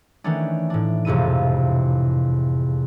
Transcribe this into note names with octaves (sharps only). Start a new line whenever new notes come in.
D#3 E3 A3 B3 C#4 D4
A2 D4
E1 F2 C3 E4 D#7